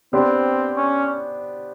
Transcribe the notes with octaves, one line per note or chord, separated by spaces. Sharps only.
B3 C4 D4 G4 C5
C#4